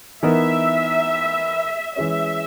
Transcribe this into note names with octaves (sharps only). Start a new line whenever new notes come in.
E3 B3 D#4 A#4 E5
E3 G#3 C#4 E5